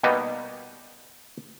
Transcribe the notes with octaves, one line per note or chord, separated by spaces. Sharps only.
B2 G3 A#3 B3 D#4